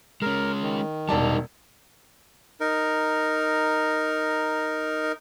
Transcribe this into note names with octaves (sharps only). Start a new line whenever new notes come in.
G#3 C#4 A#4
D#3
E1 G3 D#4 D5 A5
D#4 A#4